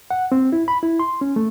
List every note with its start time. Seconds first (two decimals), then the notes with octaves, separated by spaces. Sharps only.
0.11 F#5
0.32 C4
0.52 E4
0.68 B5
0.83 E4
0.99 C6
1.21 C#4
1.36 A3